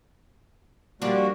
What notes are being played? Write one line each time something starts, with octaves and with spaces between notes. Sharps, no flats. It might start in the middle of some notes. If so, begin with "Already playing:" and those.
F3 G3 A#3 D4 F#4